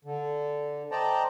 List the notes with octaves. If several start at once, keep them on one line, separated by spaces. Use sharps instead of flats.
D3
C5 D5 D#5 G5 A5 A#5